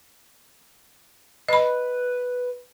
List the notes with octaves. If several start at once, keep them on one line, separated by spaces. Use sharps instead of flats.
B4 D#5 B5